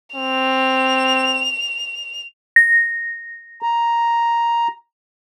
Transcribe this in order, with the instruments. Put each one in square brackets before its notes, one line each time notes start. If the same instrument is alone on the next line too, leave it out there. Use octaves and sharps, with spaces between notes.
[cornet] C4 [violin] F7
[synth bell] A#6
[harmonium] A#5